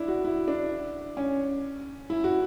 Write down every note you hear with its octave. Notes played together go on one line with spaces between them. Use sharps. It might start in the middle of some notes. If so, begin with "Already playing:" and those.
Already playing: D4 E4
F#4
E4
D4
C#4
E4
F#4